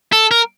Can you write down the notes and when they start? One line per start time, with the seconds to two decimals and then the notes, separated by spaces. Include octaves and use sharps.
0.13 A4
0.31 A#4